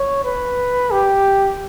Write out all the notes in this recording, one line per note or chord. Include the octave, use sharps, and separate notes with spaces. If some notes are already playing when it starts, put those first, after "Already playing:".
Already playing: C#5
B4
G4